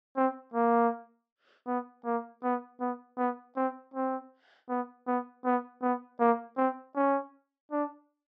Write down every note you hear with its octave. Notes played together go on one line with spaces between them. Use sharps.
C4
A#3
B3
A#3
B3
B3
B3
C4
C4
B3
B3
B3
B3
A#3
C4
C#4
D4